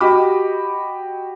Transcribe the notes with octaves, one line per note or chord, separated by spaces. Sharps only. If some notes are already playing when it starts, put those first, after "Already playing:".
F#4 G4 D#5 B5 D6